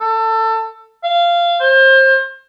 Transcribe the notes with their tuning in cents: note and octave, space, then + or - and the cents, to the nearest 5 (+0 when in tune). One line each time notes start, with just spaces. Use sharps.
A4 +25
F5 -15
C5 +30